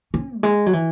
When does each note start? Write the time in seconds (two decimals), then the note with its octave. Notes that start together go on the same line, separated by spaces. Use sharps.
0.14 C#4
0.38 F#3
0.43 G#3
0.66 F#3
0.73 E3